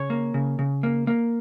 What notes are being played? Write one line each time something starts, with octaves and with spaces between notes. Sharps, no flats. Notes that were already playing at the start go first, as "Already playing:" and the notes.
Already playing: C#3 C#5
A#3
C#3
C#3
A#3
A#3